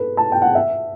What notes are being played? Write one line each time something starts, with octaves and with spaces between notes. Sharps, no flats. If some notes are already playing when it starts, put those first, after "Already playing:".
Already playing: A4 B4
A5
G5
F#5
E5